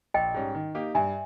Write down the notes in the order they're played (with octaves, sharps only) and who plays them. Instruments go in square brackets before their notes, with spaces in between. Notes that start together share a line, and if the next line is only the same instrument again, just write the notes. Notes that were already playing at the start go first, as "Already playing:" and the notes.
[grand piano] A#1 [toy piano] D#5 G5
[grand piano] G#2 G3 C#4
D#3
A#3 D#4 G4
[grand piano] G2 [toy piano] E5 G#5